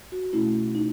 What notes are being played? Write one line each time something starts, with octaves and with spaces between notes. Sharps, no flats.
F#4
B2 A3 C#4 E4
D#4